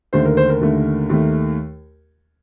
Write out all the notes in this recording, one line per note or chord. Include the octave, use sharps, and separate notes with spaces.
D#2 D3 A3 C5
A#4
C5
A#4
D#2 D3 A3
D#2 D#3 A3